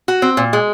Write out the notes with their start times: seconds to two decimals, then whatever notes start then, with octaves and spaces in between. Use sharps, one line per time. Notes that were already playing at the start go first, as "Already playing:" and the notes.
0.08 F#4
0.22 C4
0.37 A#2
0.53 G#3